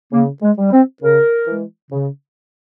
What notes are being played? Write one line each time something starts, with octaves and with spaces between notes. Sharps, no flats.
C#3 A#3
G#3
G3
C4
C#3 A#4
E3 G#3
C#3